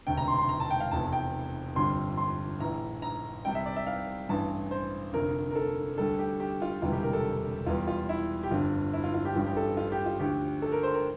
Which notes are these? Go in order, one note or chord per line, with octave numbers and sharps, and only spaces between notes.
E1 D2 C3 G5
A#5
C6
C6
A#5
A5
G5
F5
F1 E2 C3 F3 A5
G5
G1 F2 D3 G3 C6
C6
A#1 A2 E3 A#5
A#5
C2 C3 G3 G5
E5
D5
E5
F5
A1 G2 E3 A5
C5
F1 F2 D3 A#4
A#4
A4
D2 D3 G3 A4
G4
G4
F4
E1 D2 C3 E3 G3 F4
G4
A#4
A4
E2 E3 G3 F4
F4
E4
G4
G1 F2 D3 F4
E4
F4
F4
G4
A1 G2 F3 G4
G4
A4
F4
G4
F4
D2 D3 F3 G4
A4
A#4
C5
A#4